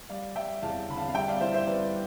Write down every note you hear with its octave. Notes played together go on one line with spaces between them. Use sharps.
G3 D5 F5
G3 E5 G5
E2 F5 A5
D3 B5
F5 A5
F5
G2 E5 G5
D5 F5
E3 C5 E5
C5 E5
G2 B4 D5